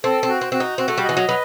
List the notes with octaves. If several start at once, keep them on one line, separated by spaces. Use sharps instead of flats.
C4 A4
C4
F#4
C4
C4 F#4
D#4
C4 F#4
A3
G3
D#5
E3
F#3
F#3 B4